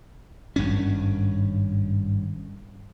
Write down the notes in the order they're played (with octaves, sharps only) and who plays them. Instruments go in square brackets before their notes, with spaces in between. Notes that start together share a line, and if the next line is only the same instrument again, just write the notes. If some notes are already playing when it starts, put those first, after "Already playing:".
[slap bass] G#1 G2 C#4